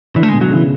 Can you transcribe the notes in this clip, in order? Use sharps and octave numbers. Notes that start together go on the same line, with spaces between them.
D3 E3
A3
G#3
B2
F#3
C#3 E3